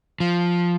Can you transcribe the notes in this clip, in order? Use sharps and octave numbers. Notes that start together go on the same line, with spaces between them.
F3